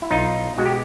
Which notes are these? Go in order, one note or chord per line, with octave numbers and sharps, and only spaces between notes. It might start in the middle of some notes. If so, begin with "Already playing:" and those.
E4
B1 D#4 F4
B2 G#3 F#4
G4